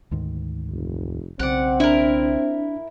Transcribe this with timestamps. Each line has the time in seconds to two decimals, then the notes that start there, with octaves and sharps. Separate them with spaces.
0.11 D2 G#2 D#3
0.69 F1
1.40 B1 C#3 C4 D5 F#5
1.80 D4 E4 A#4